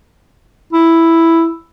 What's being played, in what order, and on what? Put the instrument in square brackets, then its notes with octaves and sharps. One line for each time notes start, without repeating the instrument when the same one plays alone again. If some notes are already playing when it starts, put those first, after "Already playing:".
[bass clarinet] E4